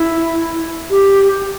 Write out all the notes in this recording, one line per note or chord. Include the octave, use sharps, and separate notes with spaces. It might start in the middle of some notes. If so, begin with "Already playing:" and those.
Already playing: E4
G4